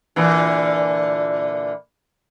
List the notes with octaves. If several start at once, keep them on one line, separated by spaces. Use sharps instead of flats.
A#2 D3 E3